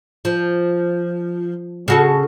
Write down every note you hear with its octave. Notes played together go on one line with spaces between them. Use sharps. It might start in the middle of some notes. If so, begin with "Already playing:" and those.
F3
C#3 F#4 A4